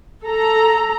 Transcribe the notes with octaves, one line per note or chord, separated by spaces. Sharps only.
A4 A#5